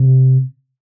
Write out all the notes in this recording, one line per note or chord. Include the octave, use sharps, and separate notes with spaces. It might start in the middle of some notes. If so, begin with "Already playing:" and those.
Already playing: C3